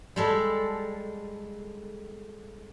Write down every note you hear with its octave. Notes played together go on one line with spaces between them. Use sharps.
G3 G#3 A4